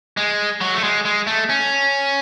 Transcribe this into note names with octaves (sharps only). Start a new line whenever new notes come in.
G#3
F#3
A3
G#3
G#3
A3
C#4